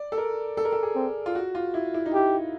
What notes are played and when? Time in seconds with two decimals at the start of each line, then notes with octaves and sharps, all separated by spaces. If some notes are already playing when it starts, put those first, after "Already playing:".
Already playing: D5
0.12 A4
0.17 A#4
0.57 A4
0.65 A#4
0.72 A4
0.83 G#4
0.95 C4
1.26 F4
1.35 F#4
1.55 F4
1.74 E4
1.94 E4
2.06 D#4
2.14 E4 G4